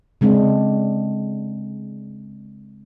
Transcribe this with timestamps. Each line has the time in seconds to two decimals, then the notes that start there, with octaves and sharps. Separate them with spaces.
0.21 C#3 G#3 C4 D4